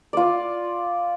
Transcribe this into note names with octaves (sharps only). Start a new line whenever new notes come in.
F4 D5